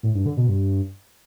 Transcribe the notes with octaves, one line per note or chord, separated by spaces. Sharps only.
A2
G2
D3
B2
G2